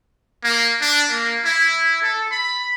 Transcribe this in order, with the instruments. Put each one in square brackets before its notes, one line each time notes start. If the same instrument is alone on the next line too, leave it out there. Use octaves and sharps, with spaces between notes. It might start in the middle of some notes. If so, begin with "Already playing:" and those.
[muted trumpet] A#3
D4
A#3
E4
A4
B5